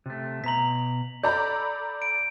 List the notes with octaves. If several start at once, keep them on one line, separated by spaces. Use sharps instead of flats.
C3 A3
B2 A#5 B6 F#7
A4 D5 A#5 B5 G6
D7